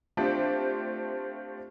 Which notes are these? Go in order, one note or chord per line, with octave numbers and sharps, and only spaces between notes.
A3 C4 D4 F4 G4 C5